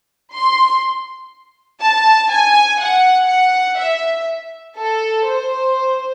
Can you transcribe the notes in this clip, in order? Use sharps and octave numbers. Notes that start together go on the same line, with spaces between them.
C6
A5
G#5
F#5
F#5
E5
A4
C5